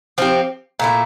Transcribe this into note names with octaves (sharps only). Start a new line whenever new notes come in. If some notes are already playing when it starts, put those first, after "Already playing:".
F3 C4 E4 G4
A#2 A3 E4